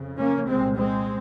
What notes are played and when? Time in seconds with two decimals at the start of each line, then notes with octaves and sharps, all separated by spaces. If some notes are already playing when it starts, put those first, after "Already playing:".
Already playing: F2 C#3
0.18 A#3 C#4
0.46 C2 A#2 G#3 C4
0.75 G#3 C4